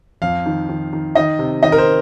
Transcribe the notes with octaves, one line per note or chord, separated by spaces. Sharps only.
F2 F5
D#3
D#3
D#3
D#3 D#5
C3
D#3 D#5
A#4
C5